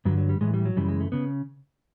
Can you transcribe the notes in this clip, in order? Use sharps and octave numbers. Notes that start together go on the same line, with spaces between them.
G2 D3 F#3
F#3
G3
A2 E3 G#3
G3
F#3
F#2 C#3 E3 G3
G#3
A3
C#3 B3